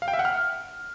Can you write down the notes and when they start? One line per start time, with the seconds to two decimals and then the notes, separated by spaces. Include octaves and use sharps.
0.02 F5
0.08 G5
0.13 E5
0.19 F#5
0.25 F6